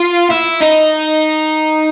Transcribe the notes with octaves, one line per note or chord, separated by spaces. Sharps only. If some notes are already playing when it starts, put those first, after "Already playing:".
Already playing: F4
E4
D#4